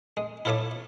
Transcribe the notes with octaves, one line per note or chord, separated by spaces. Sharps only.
G#3
E4 F4 A4 C#5 E5 D6